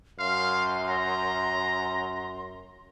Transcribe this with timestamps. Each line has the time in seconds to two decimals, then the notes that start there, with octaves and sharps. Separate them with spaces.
0.19 F#2 F5 C6
0.89 A#5